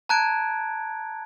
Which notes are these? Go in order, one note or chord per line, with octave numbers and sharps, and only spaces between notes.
A5 A#5 F#6 G#6 D7